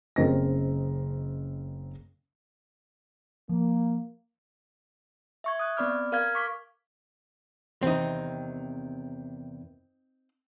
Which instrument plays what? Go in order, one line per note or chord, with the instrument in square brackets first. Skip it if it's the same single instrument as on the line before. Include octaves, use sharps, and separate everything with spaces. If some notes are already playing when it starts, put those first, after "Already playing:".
[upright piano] F#1 C#3 C4 A#4 D#5 A#6
[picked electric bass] F3 [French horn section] A#3
[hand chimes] E5 C#6 G#6
D#6 F#6 G#6
B3 C4 D5 B5 D6 F6
A#4 F5 F6 G#6
C#6 D6 F6 B6
[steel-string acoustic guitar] E2 C3 D#3 [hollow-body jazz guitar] C4 D#4